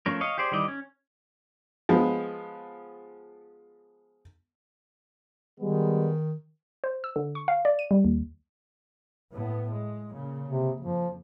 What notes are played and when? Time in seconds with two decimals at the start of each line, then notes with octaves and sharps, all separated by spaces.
0.06 F3 A3 C#4 A#4
0.21 C#5 D#5 F5
0.38 G4 G#4 C5 D5
0.52 D#3 E3 G3 D5 D#5
0.68 C#4
1.89 F3 G#3 B3
5.60 D#3 G3 G#3 B3
6.84 C5
7.04 E6
7.16 D3
7.35 C#6
7.48 F5
7.65 D5
7.79 D#7
7.91 G3
8.05 D#2
9.32 A2 B3
9.71 G#3
10.09 A#2 C#3
10.49 C3
10.81 F2 F3